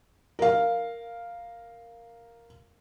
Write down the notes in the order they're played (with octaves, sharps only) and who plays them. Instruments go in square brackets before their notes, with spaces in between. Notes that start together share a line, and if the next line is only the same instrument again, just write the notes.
[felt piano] A#4 F5